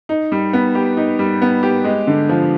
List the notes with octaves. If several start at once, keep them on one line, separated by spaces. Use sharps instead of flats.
D#4
G3
B3
G4
D#4
G3
B3
G4
G#3
D3
F3